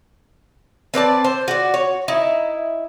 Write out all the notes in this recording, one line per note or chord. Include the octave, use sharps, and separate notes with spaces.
C4 B4 D5 A5
C5
F#4 D5
C#5
D#4 E4